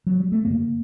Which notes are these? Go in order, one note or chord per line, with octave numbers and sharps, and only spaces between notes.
F#3
G3
A3
F#2 D3 A#3